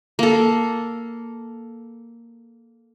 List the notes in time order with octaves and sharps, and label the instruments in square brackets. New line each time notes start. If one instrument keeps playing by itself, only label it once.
[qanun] A#3 A4